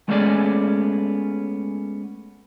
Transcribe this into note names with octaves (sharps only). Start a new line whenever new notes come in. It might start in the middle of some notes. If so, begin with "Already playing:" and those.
G#3 A3 B3 C#4 G#4 D5